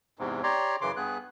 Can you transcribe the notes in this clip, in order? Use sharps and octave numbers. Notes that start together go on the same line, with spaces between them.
E2 G#2 C3
G4 C#5 D5 A#5 C6
F#2 C#3 E3 C6 D6
G2 B3 G#4 F#6